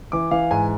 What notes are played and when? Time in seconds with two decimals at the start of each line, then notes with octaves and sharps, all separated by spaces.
0.12 E3 D6
0.31 E3 F5
0.51 G#2 G#5